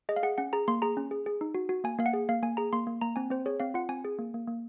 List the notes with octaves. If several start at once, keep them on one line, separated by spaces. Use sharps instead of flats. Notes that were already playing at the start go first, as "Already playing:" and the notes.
G#4 D#5
F5
G#4 F#5
C#4 F#5
G#4 A#5
A#3 C6
G#4 A#5
C#4
G#4
G#4
D#4
F#4
F#4
A#3 G#5
A#3 F5
F#5
G#4
A#3 F5
A#3 G#5
G#4 A#5
A#3 C6
A#3
A#3 A#5
C4 G#5
C4 C5
G#4 C#5
C4 F5
F4 F#5
C4 G#5
G#4
A#3
A#3
A#3